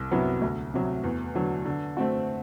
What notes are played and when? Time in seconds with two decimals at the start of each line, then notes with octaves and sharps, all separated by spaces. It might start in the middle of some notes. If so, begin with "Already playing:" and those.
Already playing: C2
0.11 C3 F#3 B3 E4
0.42 D2
0.74 C3 F#3
1.04 E2
1.35 D3 F#3
1.65 D3
1.97 A3 C4 F#4